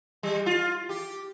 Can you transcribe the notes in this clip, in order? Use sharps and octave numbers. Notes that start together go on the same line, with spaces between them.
G3
F4
G4